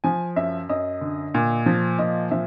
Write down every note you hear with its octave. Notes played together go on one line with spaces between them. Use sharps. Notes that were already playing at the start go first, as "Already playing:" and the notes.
F3 G#5
F#2 E5
F#2 D#5
D3
A#2
F3
A#2 D#5
F3 E5